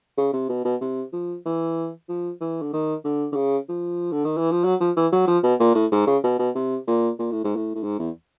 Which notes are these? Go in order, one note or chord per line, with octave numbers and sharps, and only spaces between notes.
C#3
C3
B2
B2
C3
F3
E3
F3
E3
D3
D#3
D3
D3
C#3
F3
D3
D#3
E3
F3
F#3
F3
E3
F#3
F3
B2
A#2
A2
G#2
C#3
B2
B2
C3
A#2
A#2
A2
G#2
A2
A2
G#2
E2